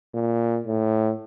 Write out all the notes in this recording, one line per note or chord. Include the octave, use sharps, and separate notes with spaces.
A#2
A2